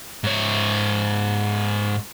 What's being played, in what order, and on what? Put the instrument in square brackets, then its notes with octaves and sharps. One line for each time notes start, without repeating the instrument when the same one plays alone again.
[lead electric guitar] G#2 C#5